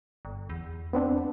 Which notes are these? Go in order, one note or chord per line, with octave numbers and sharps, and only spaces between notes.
G1
E2
B3 C4 D4